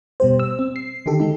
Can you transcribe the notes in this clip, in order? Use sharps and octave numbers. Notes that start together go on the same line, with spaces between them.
B2 G3 G4 C5
E6
C4
C7
D3 D#3 D#4 G4 A4
G#3 D#4